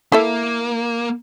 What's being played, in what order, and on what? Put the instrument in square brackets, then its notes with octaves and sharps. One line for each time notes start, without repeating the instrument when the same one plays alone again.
[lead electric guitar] A#3 [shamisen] E4 A4 E5